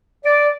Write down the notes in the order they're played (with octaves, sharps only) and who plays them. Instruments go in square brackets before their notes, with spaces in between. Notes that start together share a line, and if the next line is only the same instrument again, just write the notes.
[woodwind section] D5